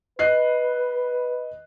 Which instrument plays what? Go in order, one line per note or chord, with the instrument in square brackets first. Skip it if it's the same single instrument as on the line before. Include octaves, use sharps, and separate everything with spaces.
[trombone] B4 [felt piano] D#5 F#6 C7